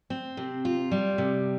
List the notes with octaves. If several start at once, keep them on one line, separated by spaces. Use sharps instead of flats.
C4
C3
F4
G3
C3